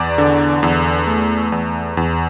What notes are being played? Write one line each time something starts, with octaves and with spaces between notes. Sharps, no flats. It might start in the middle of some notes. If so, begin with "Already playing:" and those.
Already playing: E2 D5
D3
E2
A3
E2
E2